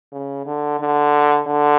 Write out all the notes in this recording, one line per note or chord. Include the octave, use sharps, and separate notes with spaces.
C#3
D3
D3
D3